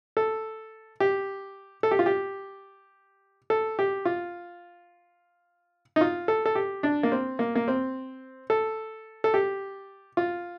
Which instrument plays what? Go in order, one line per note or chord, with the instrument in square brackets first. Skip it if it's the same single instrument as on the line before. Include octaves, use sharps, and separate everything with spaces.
[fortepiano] A4
G4
A4
G4
F4
G4
A4
G4
F4
D#4
F4
A4
A4
G4
D4
A#3
C4
A#3
A#3
C4
A4
A4
G4
F4